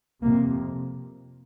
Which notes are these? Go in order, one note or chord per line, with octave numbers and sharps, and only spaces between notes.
F2 C3 A#3